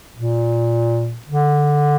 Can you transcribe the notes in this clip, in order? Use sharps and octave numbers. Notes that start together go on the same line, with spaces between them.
A#2
D3